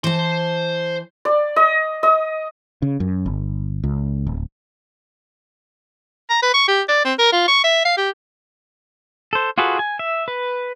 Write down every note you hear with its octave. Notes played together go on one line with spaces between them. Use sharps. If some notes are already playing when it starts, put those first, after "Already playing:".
E3 C5 A5 C6
D5
D#5
D#5
C#3
F#2
G1
C#2
D1
A#5
B4
C#6
G4
D5
C4
A#4
F4
C#6
E5
F5
G4
A4 C5
F4 F#4 G#4 A4 B4
G#5
E5
B4